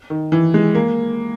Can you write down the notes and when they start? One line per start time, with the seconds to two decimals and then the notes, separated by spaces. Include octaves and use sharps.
0.10 D#3
0.32 E3
0.54 G#3
0.75 A#3